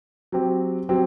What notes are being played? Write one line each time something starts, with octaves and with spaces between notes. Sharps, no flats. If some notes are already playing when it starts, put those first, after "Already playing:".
F#3 C4 G4
F#3 C4 G4